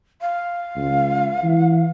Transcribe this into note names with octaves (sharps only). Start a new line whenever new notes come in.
F5
C#2
E3